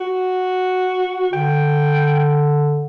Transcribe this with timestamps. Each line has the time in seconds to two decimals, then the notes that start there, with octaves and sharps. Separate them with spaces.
0.01 F#4
1.33 D3 G5